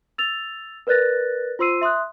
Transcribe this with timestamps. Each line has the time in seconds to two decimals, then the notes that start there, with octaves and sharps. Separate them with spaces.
0.18 E6 A6 F7
0.87 A#4 B4 D5 F#6 A6 A#6
1.59 F4 C5 C6 E6 C7 D#7
1.81 E5 C6 D#6 F#6